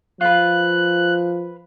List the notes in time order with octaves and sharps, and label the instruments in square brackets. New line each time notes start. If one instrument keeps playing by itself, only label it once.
[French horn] F3 [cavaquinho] F4 B4 [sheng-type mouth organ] F#6